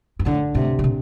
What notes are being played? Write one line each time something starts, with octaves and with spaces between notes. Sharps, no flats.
G2
A2 D3
A2 C3
C3
A#2